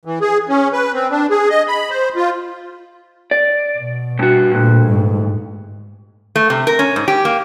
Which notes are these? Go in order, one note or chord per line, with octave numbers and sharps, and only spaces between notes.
E3
G#4
C#4
B4
C4
D4
G#4
D#5
B5
C5
F4
D5
B2
G2 F#4
D2 G2 A#2
G#2
A3
C3
A#4
C#4
G#2
G4
A#3